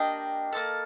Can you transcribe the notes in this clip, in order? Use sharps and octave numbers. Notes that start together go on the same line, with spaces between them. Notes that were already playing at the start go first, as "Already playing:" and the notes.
Already playing: A#3 D4 G4 D#5 G5
A#3 D#4 A4